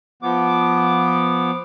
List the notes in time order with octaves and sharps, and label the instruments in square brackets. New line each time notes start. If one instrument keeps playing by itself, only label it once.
[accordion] F3 B3 D6